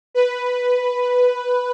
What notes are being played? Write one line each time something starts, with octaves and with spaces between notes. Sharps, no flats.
B4